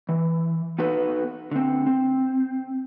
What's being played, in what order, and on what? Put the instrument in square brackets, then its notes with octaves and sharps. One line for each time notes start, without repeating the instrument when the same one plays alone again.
[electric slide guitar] E3
B3 D#4 F#4 A4 B4
D3 C4
C4